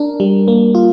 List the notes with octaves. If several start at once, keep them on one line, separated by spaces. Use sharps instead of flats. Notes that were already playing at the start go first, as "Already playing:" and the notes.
Already playing: D4 A#4
G3
A#3
F4